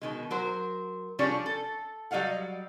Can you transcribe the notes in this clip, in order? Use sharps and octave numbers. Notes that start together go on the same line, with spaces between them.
B2 D#3 G#3
F#3 A#4 C5
F3 G3 C#4 D4 G#4 C#5
A4
F#3 G3 D#5 F5 F#5